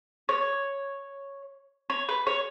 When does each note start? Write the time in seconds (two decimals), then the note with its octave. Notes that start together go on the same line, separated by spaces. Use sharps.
0.29 C#5
1.90 C#5
2.09 B4
2.27 C#5